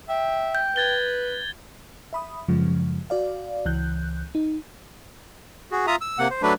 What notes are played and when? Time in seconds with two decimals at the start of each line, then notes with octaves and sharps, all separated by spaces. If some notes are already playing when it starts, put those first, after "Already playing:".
0.09 E5 G5
0.55 G6
0.76 B4 G#6 A6 G7
2.13 E5 B5 D#6
2.48 F#2 C#3 F3 G#3
3.10 F#4 D5 F5
3.65 C#2 E3 F#6 G6
4.35 D#4
5.71 F#4 G#4
5.87 F4 E5 A#5 D#6
6.01 E6
6.19 C3 A#3 F#5
6.31 C5
6.42 F#3 A3 D4 B4